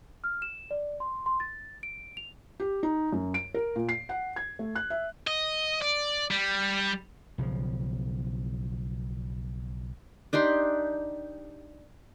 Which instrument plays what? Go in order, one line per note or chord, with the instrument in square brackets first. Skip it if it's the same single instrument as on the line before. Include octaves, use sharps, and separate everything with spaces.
[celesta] F6
E7
D5
C6
C6
A6
D7
F7
[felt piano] G4
D#4
F#2
D7
A#4
A#2
C7
F#5
G#6
A3
F#6
E5
[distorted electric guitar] D#5
D5
G3
[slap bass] B1 C#3 E3 F3
[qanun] D4 D#4 G4 C6